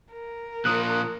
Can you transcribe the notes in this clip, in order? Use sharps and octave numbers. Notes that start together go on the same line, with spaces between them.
A#4
A#2 F3 D#6 F#6